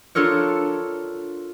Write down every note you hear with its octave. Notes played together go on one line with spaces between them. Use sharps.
D4 F4 A4 A#4 C#5